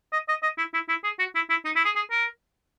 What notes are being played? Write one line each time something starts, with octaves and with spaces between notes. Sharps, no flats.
D#5
D#5
D#5
E4
E4
E4
G#4
F#4
E4
E4
D#4
E4
G#4
G#4
A#4